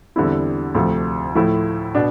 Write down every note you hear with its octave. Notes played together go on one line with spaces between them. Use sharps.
E2 D3 G3 C4 E4
D2 C3 F3 A3
A2 F3 A3 E4
B2 B3 D4